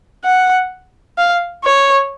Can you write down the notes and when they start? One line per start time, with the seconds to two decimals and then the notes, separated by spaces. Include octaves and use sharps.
0.25 F#5
1.18 F5
1.65 C#5